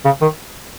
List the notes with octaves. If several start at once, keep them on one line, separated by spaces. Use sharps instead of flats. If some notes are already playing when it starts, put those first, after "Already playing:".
C#3
D#3